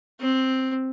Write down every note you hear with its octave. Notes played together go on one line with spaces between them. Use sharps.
C4